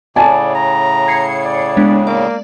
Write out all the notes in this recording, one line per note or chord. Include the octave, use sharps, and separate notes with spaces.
A2 C#3 D5 G#5 A5
A#5
G#6 C7 C#7
D5
G#3 B3 D4
A#3 D5